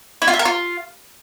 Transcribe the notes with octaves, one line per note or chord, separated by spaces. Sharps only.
E4
F4
E5
A#4
F4